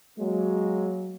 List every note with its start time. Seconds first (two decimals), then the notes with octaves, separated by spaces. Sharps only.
0.19 F#3 G#3 A#3